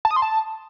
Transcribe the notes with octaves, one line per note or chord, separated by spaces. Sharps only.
A5
D#6
C6
A5